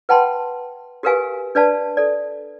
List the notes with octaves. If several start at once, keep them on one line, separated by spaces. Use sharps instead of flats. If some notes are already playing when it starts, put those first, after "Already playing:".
B4 F#5 G5 A5 B5 C6
F#4 G4 A#4 B4 F5 G#5
D4 B4 D5 F5 A5
A4 D5